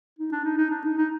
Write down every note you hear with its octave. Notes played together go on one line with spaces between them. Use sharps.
D#4
D4
D#4
D#4
D4
D#4
D#4